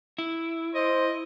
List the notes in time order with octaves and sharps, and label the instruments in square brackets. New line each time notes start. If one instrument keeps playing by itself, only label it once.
[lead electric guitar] E4
[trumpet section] C5 [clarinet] D#5